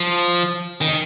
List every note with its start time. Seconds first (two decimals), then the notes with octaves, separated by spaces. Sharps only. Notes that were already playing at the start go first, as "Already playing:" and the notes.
Already playing: F3
0.81 D#3